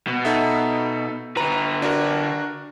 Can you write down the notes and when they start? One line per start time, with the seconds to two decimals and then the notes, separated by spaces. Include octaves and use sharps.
0.07 B2
0.25 D#4 A4 E5
1.37 D3 B4 A#5
1.82 D4 F#4 A#4